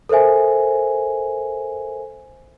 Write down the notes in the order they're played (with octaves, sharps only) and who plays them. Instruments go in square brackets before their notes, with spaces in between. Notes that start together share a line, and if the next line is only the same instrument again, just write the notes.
[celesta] A4 A#4 C5 E5 G#5